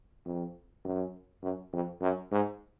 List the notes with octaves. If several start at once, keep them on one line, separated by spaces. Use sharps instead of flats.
F2
F#2
F#2
F2
F#2
G#2